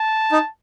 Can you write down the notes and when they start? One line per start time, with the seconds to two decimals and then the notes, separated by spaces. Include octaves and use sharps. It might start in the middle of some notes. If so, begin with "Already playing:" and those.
Already playing: A5
0.32 D#4